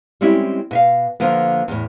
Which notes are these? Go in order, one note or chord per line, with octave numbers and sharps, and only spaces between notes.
G3 G#3 C4 C#4 E4 G4
B2 E5 F5
D3 F3 A#3 B3
E2 A2